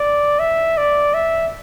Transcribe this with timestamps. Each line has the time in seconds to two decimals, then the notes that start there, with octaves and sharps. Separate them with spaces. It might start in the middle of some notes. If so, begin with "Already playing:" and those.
Already playing: D5
0.40 E5
0.77 D5
1.14 E5